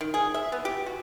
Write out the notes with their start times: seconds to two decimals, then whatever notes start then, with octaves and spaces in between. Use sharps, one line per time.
0.01 D#3
0.14 G#4
0.34 E5
0.52 B3
0.65 G4
0.86 F#4